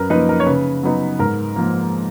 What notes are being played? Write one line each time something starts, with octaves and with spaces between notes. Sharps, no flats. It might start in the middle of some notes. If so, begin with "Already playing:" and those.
Already playing: F#2 A#4 B4
F3 A#3 D#4 B4
A#4
C#5
C#3 B4
F#3 B3 D#4
G#2 A#4
F3 A#3